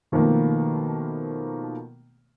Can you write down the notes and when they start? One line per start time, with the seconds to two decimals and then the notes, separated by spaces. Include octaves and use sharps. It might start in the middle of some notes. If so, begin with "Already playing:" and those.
0.12 B2 D#3 F3 A3 A#3